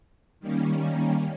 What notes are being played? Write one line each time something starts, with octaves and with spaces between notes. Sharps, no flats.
D#3 G3 A#3 C#4